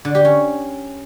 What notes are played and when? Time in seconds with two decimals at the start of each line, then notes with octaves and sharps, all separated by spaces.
0.05 D3
0.15 G4
0.25 C#4